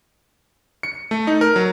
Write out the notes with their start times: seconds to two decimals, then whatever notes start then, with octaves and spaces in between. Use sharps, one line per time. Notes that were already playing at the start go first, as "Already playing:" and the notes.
0.83 C#7
1.11 A3
1.27 D#4
1.41 A#4
1.56 F#3